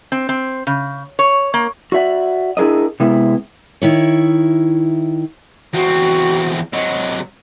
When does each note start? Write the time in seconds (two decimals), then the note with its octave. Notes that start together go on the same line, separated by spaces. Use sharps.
0.12 C4
0.29 C4
0.67 C#3
1.19 C#5
1.54 A#3
1.92 F#4 D5 E5 F#5
2.57 D4 E4 G#4 A#4 D#5
3.00 C3 G#3 B3 E4
3.82 D#3 E4 C#5
5.74 E2 C4 F#4
6.73 C3 F#3 D#5